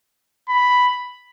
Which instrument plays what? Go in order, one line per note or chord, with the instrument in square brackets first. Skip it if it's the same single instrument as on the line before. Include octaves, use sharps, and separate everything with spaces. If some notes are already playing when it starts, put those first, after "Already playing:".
[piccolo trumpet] B5